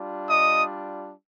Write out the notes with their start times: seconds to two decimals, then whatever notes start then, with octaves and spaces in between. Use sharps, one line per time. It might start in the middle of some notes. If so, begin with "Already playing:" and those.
Already playing: G3 D4 F4
0.28 D#5 D#6